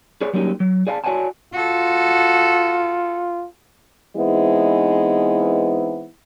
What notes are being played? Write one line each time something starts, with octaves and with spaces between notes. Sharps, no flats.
G#4 B4 C#5 D5
F#3 G3 A#3 C#4 D#4 G4
F#3
G#4 D5 F5 G5 A5
F#4 C#5 D5 F#5 G#5 A5
F4 F#4 A4
E3 G#3 B3 C4 D#4 E4